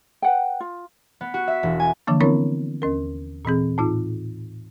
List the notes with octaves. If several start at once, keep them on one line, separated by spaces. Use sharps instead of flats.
B4 F#5 G5
F4
B3
F#4
E5
E1
G#5
D3 E3 F3 A#3 D4
B3 C4 D4 E4 A#4 C#5
D#2 C#4 A#4
A#2 E3 C4 G#4
A2 D#4 F4